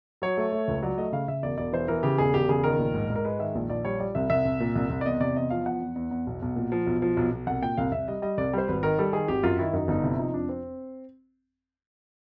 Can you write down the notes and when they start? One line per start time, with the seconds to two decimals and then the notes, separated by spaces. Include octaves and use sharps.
0.22 F#3 C#5
0.37 A3
0.52 A3
0.68 C#2
0.83 F#3 D5
0.98 A3 D#5
1.13 C#3 F5
1.28 C#3 E5
1.43 E1 D5
1.58 E1 D5
1.73 E3 C5
1.88 E3 A#4
2.03 C#3 G4
2.18 E1 G#4
2.34 E1 G4
2.49 C#3 G#4
2.64 D#3 A#4
2.79 A#1
2.94 G#2
3.10 G#2
3.16 A#4
3.25 G#3 B4
3.39 D#3 E5
3.55 A#1
3.70 A#1 D5
3.85 G3 C#5
4.00 G3 D5
4.15 C2 E5
4.30 C2 E5
4.45 C2
4.60 A#2
4.76 C2
4.90 C2
5.01 D5
5.05 E2 D#5
5.20 C3 D5
5.36 E2 D#5
5.50 F3 F5
5.66 E2 F#5
5.81 E2
5.96 E2
6.11 E2
6.27 B1
6.42 B1
6.56 A#2
6.72 F3
6.87 B1
7.02 F3
7.17 B1
7.32 B1
7.47 C2 F#5
7.62 A#2 G5
7.77 C2 F5
7.92 C2 E5
8.08 G3 D#5
8.22 G3 D#5
8.38 C2 D5
8.53 G3 C5
8.68 G#1 B4
8.83 D#3 A#4
8.99 G3 A4
9.13 D#3 G#4
9.28 G#1 G4
9.43 F#2 F4
9.59 D#3 E4
9.73 F#2 D#4
9.88 G1 D#4
10.04 C3 E4
10.19 F3 D#4
10.34 F2 D4
10.49 C4